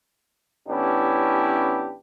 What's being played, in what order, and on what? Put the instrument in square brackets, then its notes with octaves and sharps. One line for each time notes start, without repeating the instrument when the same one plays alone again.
[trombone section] A1 B3 C#4 D4 E4 G4